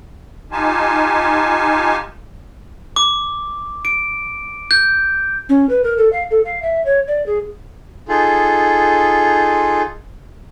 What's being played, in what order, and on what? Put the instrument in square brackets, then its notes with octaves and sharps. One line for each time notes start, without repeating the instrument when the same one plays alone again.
[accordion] D#4 F4 G4 G#5 A5
[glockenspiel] D6
D7
G6
[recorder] C#4
B4
A#4
A4
F5
A4
F5
E5
C#5
D5
G#4
[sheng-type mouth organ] D#4 F4 G#4 A4